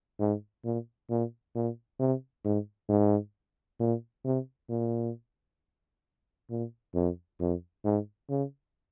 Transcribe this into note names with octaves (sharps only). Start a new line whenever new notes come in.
G#2
A#2
A#2
A#2
C3
G#2
G#2
A#2
C3
A#2
A#2
F2
F2
G#2
C#3